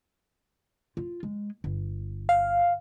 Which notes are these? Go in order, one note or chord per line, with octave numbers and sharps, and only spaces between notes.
F4
G#3
G1
F5